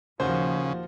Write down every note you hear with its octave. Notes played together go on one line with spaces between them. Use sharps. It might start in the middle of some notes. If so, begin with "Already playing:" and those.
D#2 A#2 C#3 F3 F4 F#4 C5